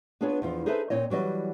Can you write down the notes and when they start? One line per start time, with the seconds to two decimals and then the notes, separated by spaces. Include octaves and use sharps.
0.21 B3 D4 F4 G#4 B4 C#5
0.42 E2 F3 F4
0.66 D#4 G#4 A4 B4 C5 E5
0.90 A#2 C4 D#4 C#5 D#5
1.10 E3 F#3 G3 D#5